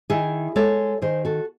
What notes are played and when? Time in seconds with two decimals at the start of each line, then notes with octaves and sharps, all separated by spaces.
0.10 D#3 E4 G#4
0.56 G#3 A4 C#5
1.02 D#3 G#4 C5
1.25 F#4 A4